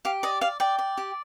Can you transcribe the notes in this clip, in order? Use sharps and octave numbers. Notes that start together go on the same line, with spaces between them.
G4 F5
D5 D#5
D5 F5
D5 G5
D5
G4